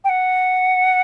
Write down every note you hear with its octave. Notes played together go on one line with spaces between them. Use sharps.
G5
F#5